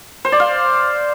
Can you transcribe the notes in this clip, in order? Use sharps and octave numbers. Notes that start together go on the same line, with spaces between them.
C5
D5
F5